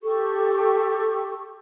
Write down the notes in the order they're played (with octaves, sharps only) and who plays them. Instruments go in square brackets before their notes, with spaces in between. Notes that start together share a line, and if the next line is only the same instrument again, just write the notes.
[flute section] G4 A4 C#6